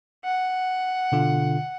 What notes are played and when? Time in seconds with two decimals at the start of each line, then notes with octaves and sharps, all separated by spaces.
0.25 F#5
1.12 B2 D3 F4